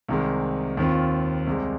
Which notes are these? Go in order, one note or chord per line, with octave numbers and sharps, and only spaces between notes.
C2 C3 D#3 G#3
D#2 D#3 C4 F4
C2 C3 G#3